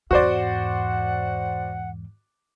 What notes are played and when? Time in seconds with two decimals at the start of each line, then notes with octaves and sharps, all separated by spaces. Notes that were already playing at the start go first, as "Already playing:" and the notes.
0.11 E2 G#2 F#4 C5 D5 F#5